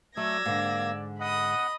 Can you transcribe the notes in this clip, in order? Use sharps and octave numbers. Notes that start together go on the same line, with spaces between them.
F#3 A3 A4 D5 E6 G#6 A#6
G#2 D3 A#3
D#5 F#5 B5 D#6